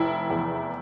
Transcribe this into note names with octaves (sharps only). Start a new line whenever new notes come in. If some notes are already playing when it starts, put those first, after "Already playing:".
Already playing: F1 E4
E2